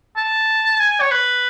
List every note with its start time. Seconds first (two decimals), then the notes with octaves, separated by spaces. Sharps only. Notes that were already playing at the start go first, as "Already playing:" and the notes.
0.17 A5
0.80 G#5
1.01 C#5
1.11 B4